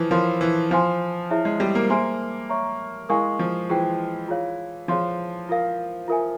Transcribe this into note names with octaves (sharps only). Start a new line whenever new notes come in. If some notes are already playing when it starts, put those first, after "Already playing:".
Already playing: E3 F3
F3 A#4 C#5 F5 C6
E3
F3 C5 F5 G#5 C6
E4 G#4 C#5 E5
G#3
G3
A#3
A#3 G#4 C5 E5 G#5 C6
C#5 E5 A#5 C#6
G#3 E4 A#4 F5 G#5 C#6
F3
E3 F4 G#4 C5 G5
F4 G#4 C#5 F5
F3 G#4 C#5 F5 C6
F4 A#4 F5
F4 A#4 E5 G#5